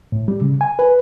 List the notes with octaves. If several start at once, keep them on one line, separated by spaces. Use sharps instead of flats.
A2
G3
C#3
G#5
B4